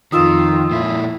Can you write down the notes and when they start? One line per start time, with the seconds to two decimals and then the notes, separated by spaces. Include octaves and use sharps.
0.12 F2 D#3 F4 D#6 E6 E7
0.71 A#2 E4